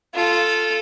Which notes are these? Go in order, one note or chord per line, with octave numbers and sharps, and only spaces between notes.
F4 A4